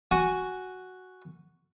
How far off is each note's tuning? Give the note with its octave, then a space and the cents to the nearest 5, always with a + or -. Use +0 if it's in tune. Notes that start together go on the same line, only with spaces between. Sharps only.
F#4 +0 G#5 +0